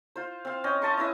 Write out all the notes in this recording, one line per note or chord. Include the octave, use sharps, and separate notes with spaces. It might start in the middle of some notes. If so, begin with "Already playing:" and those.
F4 C5
C4 F5
C#4 D#5 G5
D#5 A5 C6 C#6
C#4 E4 B4 D#5